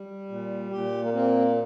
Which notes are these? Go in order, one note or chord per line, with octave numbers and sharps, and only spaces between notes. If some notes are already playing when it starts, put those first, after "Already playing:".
Already playing: G3
A#2
A#2 G4
A#3
A#3 C4